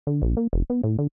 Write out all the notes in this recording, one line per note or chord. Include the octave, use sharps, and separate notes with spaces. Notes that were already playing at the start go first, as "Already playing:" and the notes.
D3
A#1
A#3
F1
B3
A2
D3